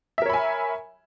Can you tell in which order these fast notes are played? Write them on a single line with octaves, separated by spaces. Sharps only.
E5 A#4 C#5 B5 G#5